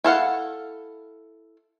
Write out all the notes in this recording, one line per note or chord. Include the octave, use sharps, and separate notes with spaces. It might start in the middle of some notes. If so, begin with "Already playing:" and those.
E4 A4 F5 F#5